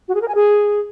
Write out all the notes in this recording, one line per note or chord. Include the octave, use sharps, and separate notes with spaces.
F#4
G#4
A#4
G#5
G#4